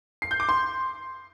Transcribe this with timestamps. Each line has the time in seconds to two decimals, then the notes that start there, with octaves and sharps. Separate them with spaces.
0.22 C7
0.31 G6
0.40 D6
0.49 C6